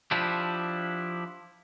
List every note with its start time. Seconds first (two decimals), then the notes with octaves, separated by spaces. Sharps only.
0.11 F3 D4 E4 G4